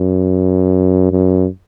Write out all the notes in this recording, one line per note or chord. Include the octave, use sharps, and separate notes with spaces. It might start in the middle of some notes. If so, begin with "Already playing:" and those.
Already playing: F#2
F#2